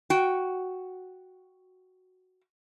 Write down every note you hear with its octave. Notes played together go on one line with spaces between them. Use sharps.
F#4 G5